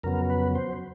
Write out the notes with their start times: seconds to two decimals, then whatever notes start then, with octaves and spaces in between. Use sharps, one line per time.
0.03 F2 C#3 F#3 B3 A#4
0.30 B4
0.55 C5